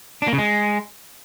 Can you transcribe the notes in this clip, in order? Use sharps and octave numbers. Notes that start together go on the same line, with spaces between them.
D4
A#3
C#3
G#3